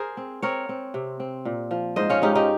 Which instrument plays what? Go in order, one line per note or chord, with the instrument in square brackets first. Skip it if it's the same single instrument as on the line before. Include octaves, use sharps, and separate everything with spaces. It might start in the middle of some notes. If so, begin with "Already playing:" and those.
Already playing: [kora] G#4 A#4 C5
C4
C4 A#4 C#5
C4
C3
C4
A#2
F3
G#2 C5 D#5
C#4 F4
G#2 D#4 G4
D#4 G4